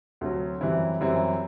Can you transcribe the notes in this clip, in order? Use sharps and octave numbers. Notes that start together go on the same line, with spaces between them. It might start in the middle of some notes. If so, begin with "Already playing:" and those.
D2 C3 F#3
F#2 E3 G3 C4 E4
F#2 E3 G3 C4 E4